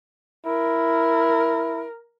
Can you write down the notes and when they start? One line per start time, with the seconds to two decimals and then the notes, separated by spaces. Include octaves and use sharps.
0.46 E4 A#4